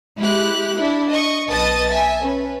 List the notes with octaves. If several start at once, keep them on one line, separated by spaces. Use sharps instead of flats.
G#3 E4 G4 F#6
D4 E4
D#5 C#6
B1 B4 D#5 A5 D#6 A6
E5 G#5 A5
C#4 B4